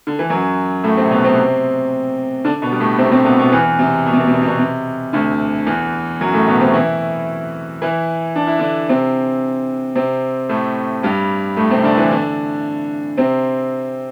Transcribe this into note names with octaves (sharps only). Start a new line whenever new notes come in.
D3
E3
F#2 F#3
A2 A3
C3 C4
B2 B3
C3 C4
D3 D4
B2 B3
G3
A2 A3
C3 C4
C3 C4
B2 B3
B2 B3
E2 E3
C3
B2
C3
B2
C3
B2
C3
B2
C3
D2 D3
E2 E3
F#2 F#3
A2 A3
B2 B3
C3 C4
E3 E4
E3 E4
D4
E4
D3 D4
C3 C4
C3 C4
A2 A3
G2 G3
A2 A3
C3 C4
D3 D4
E3 E4
D3 D4
C3 C4